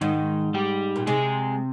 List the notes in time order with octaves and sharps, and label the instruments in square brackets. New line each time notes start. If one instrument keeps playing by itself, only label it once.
[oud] G#2 [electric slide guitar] D#3 D#4
[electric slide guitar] G3 G4
[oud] A#2
[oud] C3 [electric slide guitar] G#3 G#4